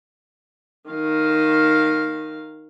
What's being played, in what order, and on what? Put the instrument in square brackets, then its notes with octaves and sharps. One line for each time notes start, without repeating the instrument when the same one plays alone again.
[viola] D#3 F5